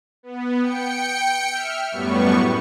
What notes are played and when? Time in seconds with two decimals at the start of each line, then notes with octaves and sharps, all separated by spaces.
0.23 B3
0.61 G5 C#7
1.51 E5 F6
1.91 F#2 A2 G3 B3 C#6